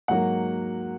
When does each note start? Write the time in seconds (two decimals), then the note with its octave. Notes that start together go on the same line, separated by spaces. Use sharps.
0.08 G#2 F#3 A#3 F#5